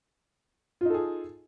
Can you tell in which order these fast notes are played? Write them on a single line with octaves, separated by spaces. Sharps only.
F4 D#4 A4 G#4